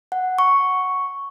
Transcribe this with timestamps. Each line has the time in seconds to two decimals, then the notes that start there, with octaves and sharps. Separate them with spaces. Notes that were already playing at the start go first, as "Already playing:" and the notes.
0.12 F#5
0.38 C#6